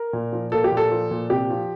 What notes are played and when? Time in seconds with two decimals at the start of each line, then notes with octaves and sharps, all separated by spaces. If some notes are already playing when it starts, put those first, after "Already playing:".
Already playing: A#4
0.13 A#2
0.33 F3
0.52 A#3 A4
0.64 G4
0.72 A#2
0.77 A4
0.92 F3
1.11 A#2
1.30 C3 G4
1.50 F3